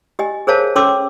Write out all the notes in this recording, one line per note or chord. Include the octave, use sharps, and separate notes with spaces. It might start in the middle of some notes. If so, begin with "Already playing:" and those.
G4 D#5 G#5
G#4 A#4 C5 C#5 F5 A5
C#4 A4 C#5 C6 D6 E6